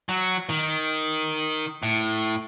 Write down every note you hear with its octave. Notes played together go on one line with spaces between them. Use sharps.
F#3
D#3
A2